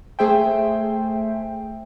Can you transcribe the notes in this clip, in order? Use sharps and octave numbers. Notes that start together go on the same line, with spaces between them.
A3 G#4 C5 E5 G5